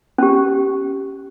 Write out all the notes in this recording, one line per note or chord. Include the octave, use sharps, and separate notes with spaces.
C#4 G4